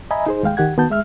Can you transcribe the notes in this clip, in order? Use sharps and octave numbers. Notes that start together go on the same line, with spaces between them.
D#5 E5 G#5 A#5 B5
D#4 G#4 C5
D#2 G#3 F5 G5
D#3 G4 F#5 G#6
D#3 B3 F#4 A5 G6
G#3 E5 F6